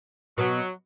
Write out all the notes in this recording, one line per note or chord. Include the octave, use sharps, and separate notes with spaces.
B2 F#3 B3